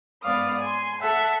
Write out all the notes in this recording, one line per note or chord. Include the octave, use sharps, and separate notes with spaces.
G#2 B3 D5 F5 D#6
G#5 C6
A4 E5 F#5 A5